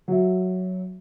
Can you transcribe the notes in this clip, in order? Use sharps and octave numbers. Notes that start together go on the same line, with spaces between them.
F#3 E5